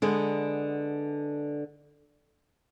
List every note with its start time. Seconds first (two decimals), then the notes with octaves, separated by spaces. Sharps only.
0.02 D3 G#3 B3